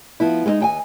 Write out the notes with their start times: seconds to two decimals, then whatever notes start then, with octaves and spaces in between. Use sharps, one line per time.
0.20 F3 B3 E4
0.46 G#3 B3 C4 D#4
0.60 D#2 G5 G#5